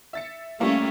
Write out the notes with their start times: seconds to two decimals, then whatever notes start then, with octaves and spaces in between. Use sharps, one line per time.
0.13 E5 A6 C#7
0.60 G3 A3 A#3 C#4 F4